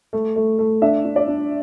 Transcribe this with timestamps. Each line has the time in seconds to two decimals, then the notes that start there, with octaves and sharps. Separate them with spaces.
0.13 A3
0.36 A3
0.59 A3
0.82 D4 E5
1.05 D4
1.16 D5
1.28 D4